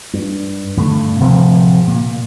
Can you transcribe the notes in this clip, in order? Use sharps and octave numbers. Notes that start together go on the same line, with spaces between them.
G2
G2 D3 A3
D1 C3 F3 C4
A#2